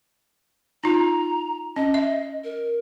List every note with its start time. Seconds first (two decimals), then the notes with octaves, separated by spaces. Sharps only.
0.84 D#4 F4 A#5
1.76 C#4 D#5
1.94 E5
2.44 A#4